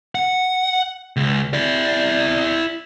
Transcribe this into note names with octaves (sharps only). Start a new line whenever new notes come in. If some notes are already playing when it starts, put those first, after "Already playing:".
F#5
C#2
E4 D5